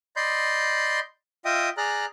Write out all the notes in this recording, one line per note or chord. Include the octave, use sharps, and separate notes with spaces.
D5 D#5 B5 C6 G6
F4 D#5 E5 G5 D#6
G#4 D5 A#5 F6 F#6